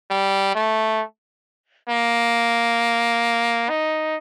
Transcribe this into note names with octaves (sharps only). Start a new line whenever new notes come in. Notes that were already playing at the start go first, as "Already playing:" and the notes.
G3
A3
A#3
D#4